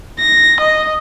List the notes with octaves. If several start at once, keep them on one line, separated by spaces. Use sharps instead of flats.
A#6
D#5